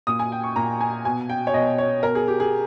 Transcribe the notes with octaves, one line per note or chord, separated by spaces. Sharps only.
A#2 D#6
G#5
G5
C#6
A#2 A#5
G#5
B2 G#5
G5
C#5
B2 D#5
C#5
B2 A#4
G#4
G4
G#4